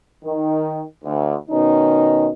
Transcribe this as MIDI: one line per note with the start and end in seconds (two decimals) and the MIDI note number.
0.24 0.83 51
1.04 1.35 38
1.50 2.29 47
1.50 2.29 51
1.50 2.29 61
1.50 2.29 63